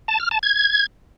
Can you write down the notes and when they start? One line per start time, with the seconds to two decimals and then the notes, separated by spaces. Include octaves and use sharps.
0.08 A5
0.20 F6
0.31 A5
0.43 G#6